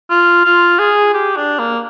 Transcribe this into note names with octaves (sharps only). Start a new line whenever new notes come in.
F4
F4
G#4
G4
D4
A#3